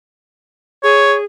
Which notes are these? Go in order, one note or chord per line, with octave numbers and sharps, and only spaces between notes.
G#4 C#5